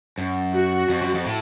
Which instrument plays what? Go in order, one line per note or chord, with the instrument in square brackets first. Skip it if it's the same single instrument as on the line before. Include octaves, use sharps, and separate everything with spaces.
[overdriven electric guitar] F#2
[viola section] F#4
[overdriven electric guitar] F2
F#2
F2
A2